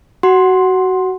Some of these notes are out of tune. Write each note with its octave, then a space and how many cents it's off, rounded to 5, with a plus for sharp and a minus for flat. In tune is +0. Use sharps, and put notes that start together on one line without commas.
F#4 +15 F#5 +5 C6 +5